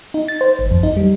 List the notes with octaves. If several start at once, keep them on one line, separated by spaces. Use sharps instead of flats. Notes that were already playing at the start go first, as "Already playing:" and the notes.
D#4
A6
C5
G#1
F2
D#4
G3